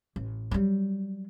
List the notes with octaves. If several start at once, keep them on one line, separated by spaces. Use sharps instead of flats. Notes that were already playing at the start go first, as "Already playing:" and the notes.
A1
F#3 G3